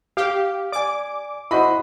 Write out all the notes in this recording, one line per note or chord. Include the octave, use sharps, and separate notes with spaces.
G4 F5
D5 G#5 D6
E4 F#4 C5 D#5 B5